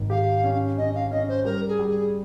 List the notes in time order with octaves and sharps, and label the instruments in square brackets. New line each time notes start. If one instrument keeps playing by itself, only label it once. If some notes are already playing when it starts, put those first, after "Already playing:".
Already playing: [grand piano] G#1
[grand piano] G4 [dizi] F5
[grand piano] C#4
[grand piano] C#4 [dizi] D#5
[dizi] F5
[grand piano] C#4 [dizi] D#5
[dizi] C5
[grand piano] G3 [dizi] A#4
[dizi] G#4
[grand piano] G3
[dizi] G#4